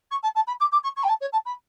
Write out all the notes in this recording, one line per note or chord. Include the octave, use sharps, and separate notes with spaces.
C#6
A5
A5
B5
D6
D6
C#6
C#6
G5
A5
C#5
A5
B5